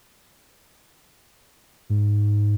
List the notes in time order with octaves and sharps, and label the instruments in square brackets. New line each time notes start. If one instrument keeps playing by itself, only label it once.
[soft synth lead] G#2